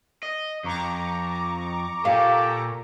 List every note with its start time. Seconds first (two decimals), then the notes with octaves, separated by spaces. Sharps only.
0.23 D#5
0.64 F2 A#5 C#6 D6
2.05 A#2 G4 A4 F5